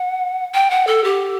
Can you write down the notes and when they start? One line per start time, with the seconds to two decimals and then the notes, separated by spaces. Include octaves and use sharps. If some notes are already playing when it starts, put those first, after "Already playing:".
Already playing: F#5
0.54 G5
0.70 F#5
0.87 A4
1.04 G4